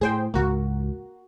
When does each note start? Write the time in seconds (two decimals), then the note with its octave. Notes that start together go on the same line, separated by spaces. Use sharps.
0.01 A2 G#4 C5 G5
0.34 C#2 G#2 A#3 F#4